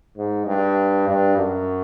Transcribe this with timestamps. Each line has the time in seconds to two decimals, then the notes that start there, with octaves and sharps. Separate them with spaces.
0.17 G#2
0.46 G2
1.08 G2
1.38 F#2